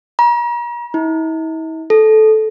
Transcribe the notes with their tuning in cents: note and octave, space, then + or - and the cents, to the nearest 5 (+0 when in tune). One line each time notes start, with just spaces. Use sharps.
A#5 +40
E4 -45
A4 -15